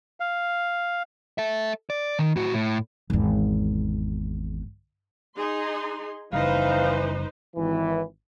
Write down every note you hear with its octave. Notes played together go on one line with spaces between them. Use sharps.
F5
A4 E5
D5
D#3
A2 F#4
A2
G#1 E2
D#4 G#4 C6
F#1 C#3 E3 G3 D#4 B4 C5 F5
G#1 E3